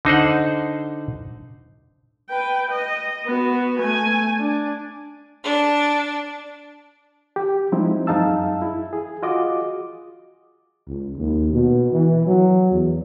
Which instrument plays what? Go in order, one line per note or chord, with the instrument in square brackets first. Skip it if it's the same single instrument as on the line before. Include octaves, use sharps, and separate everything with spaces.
[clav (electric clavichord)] D3 D#4 C5 F#5
[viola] B4 G5
D#5
B3 F#4
A3 G#5
D4
[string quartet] D4
[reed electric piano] G4
F3 G3 G#3 C4 D#4 E4
F#2 D#4 G#4 F5 A5 E6
E4
G#4
F4 F#4 G#4 D#5 D6
[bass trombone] C#2
D#2
B2
E3
F#3
E2